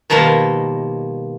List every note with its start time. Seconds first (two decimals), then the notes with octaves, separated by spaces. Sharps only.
0.10 B2 D#3 F3 G3 A#3